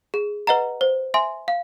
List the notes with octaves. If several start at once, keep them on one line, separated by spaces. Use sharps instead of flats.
G#4
B4 D#5 F#5 A#5
C5
E5 G#5 C6
F5